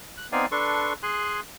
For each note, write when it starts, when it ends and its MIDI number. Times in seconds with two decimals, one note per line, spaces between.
0.17 0.27 90
0.32 0.46 59
0.32 0.46 60
0.32 0.46 63
0.32 0.46 74
0.32 0.46 77
0.32 0.46 80
0.52 0.93 62
0.52 0.93 69
0.52 0.93 71
0.52 0.93 84
0.52 0.93 85
1.03 1.40 68
1.03 1.40 80
1.03 1.40 84
1.03 1.40 90